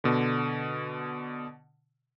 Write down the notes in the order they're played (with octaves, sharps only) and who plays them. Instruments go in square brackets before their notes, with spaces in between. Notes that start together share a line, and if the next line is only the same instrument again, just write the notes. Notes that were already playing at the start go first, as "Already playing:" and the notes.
[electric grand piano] B2 D3